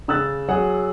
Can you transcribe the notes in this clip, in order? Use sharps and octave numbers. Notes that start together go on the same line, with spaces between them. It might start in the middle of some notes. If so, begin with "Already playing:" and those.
C#3 E6 F#6 A6
F#3 G#4 F#5